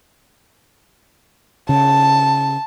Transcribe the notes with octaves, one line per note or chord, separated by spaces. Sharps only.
C#3 A5